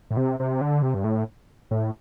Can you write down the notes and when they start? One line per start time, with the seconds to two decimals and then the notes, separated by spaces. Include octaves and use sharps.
0.11 A2
0.17 C3
0.40 C3
0.61 D3
0.82 C3
0.94 G2
1.04 A2
1.71 A2